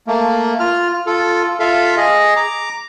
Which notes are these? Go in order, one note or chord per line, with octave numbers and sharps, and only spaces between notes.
A3 A#3
F4 F6
F4 A4
F4 A4 E5 F5
G#4 D#5
A#5 D6